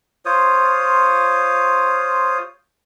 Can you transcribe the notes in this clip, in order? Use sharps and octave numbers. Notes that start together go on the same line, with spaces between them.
F4 C5 C#5 D#6